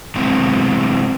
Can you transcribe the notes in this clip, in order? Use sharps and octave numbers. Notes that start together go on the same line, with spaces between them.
C3 E3 F#3 G#3 B3 C4